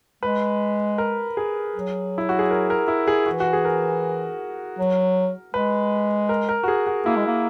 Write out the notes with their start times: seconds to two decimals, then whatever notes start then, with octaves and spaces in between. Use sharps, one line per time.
0.23 G#3 B4
0.98 A#4
1.37 G#4
1.75 F#3
2.18 E4
2.29 F#4
2.39 G#4
2.51 A#4
2.70 A#4
2.88 E4
3.08 G#4
3.26 E3 F#4
3.40 F#4
3.53 G#4
3.65 A#4
4.79 F#3
5.54 G#3 B4
6.29 A#4
6.49 A#4
6.63 F#4
6.68 G#4
6.87 F#4
7.06 A#3 E4
7.16 G#3
7.27 A#3